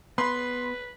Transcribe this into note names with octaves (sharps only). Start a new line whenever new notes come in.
B3 B4 B5 C6